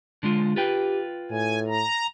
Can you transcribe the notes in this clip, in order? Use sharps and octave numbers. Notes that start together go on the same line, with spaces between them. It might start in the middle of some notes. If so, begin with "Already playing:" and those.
D3 G#3 F4
F4 G4 B4 G5
A2 G#5
A#5